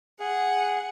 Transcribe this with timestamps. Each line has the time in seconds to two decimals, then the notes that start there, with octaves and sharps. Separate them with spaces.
0.20 G#4 F#5